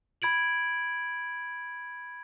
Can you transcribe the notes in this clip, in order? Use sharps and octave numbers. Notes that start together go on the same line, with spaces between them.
B5 G#6 D7 F#7